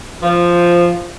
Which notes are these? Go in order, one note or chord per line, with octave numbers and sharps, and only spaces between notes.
F3